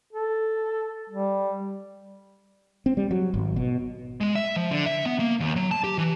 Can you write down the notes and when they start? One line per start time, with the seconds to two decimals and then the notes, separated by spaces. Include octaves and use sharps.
0.13 A4
1.10 G3
2.86 C4
2.97 G3
3.11 F#3
3.34 G#1
3.56 B2
4.21 G#3
4.35 E5
4.56 F3
4.71 D3
4.86 E5
5.06 B3
5.20 A#3
5.40 D#2
5.56 F#3
5.71 A5
5.84 G4
5.98 E3